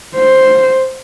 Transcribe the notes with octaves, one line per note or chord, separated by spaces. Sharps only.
C5